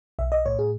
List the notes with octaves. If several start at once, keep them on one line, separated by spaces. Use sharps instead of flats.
B1 E5
D#5
A2 C#5
G#4